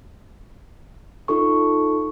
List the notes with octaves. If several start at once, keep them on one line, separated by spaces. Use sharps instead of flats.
D#4 F4 A4 C#6